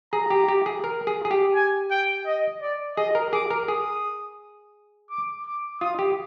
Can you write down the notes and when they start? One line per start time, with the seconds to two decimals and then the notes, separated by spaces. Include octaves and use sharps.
0.13 G#4 A#5
0.30 G4
0.48 G4
0.66 G#4
0.84 A#4
1.07 G#4
1.25 G#4
1.31 G4
1.55 G#5
1.91 G5
2.26 D#5
2.62 D5
2.97 G#4 D#5
3.15 A#4
3.33 G#4 D6
3.51 A#4
3.68 G#4 D#6
5.10 D6
5.46 D6
5.81 F4 D#6
5.99 G4